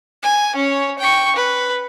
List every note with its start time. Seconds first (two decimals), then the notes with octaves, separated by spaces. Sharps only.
0.23 G#5
0.56 C#4 C#5
0.99 G5 C#6
1.36 B4